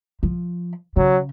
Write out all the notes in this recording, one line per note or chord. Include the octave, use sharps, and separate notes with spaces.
F3
C#3 F#3